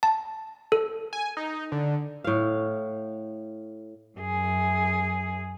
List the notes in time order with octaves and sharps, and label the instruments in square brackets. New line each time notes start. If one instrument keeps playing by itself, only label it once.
[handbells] A5
A4
[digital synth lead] G#5
D#4
D3
[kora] A2 F5
[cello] F#2 G#4